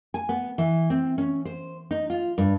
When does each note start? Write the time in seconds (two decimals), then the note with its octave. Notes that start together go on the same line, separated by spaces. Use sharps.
0.14 G#5
0.29 B3
0.58 E3
0.90 C4
1.18 C#4
1.45 C5
1.91 D#4
2.10 F4
2.38 G2